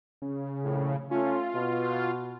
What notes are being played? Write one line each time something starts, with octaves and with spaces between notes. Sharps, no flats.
C#3
A#1 A2
A3 C#4 F4
B2 F#4